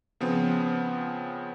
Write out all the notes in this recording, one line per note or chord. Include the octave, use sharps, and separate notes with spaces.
C#3 F3 B3 C4